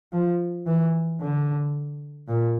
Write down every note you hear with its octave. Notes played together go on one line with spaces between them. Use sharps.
F3
E3
D3
A#2